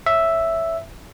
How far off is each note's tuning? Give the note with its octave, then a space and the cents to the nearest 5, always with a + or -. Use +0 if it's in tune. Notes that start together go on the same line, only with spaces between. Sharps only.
C#5 +0 E5 +0